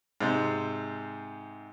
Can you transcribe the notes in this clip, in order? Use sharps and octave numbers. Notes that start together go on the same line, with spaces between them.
G#2 C3